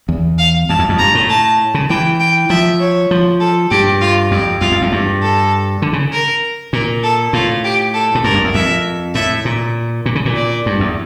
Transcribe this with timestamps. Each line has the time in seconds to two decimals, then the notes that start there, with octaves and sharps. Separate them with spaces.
0.09 E2
0.38 F5
0.69 F2 A5
0.79 E2
0.89 F2
0.98 G2 A#5
1.15 A2
1.29 A5
1.74 C#3
1.90 E3 G5
2.20 G5
2.50 F3 E5
2.80 C#5
3.11 F3
3.40 A4
3.71 G2 G4
4.01 F4
4.31 F2 G4
4.61 E2 F4
4.72 F2
4.82 E2
4.92 G2
5.22 A4
5.82 D3
5.93 C#3
6.13 A#4
6.73 A#2 A#4
7.03 A4
7.33 A2 F4
7.64 G4
7.94 A4
8.15 A2
8.24 G2 A#4
8.34 F2
8.44 E2
8.54 F2 E5
9.15 A2 E5
9.45 A#2
10.06 A#2
10.15 C#3
10.25 A#2
10.36 D5
10.66 G2
10.80 E2